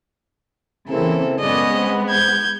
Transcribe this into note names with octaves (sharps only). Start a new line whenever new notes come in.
C#3 E3 A#3 C4 E4 A4
F#2 A2 G#3 B3 C#4 D5 D#5
C4
G6 G#6